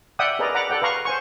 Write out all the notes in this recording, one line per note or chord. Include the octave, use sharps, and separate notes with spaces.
D5 E5 F#5 G5 D#6
G#4 A#4 B4 D5 D#5 A#5
D5 F#5 A#5 B5 D6
A4 D5 F#5 G5
B4 F5 A#5 C#6
C5 G#5 C#6